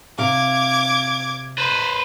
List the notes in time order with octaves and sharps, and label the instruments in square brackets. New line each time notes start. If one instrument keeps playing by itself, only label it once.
[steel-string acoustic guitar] C3 F5 [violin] D6 G#6
[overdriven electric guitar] B4 C5